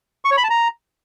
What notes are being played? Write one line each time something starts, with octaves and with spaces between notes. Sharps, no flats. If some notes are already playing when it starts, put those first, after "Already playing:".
C#6
C#5
B5
A5
A#5